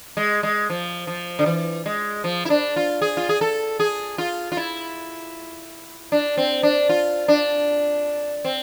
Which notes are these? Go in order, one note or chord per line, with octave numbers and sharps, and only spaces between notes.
G#3
G#3
F3
F3
D3
E3
G#3
F3
E4
D4
F4
G#4
F4
G#4
A4
G#4
F4
F4
E4
D4
C4
D4
F4
D4
C4